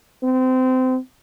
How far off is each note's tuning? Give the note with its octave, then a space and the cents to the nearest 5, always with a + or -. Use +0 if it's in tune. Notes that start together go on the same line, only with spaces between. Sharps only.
C4 -25